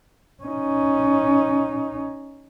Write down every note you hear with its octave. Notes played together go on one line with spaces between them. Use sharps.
C#4 D#4